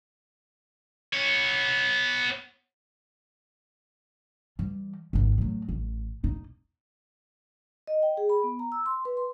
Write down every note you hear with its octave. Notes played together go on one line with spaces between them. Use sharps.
B3 C#5
E3 G3
G#1 D#2
A2 F#3
A1
E1 D#4
D#5
G5
G#4
B5
B3
A#5
E6
C6
B4
C6